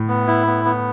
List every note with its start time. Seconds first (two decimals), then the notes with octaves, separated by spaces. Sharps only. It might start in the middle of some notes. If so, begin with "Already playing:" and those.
Already playing: A2
0.08 B3
0.27 E4
0.47 B3
0.65 B3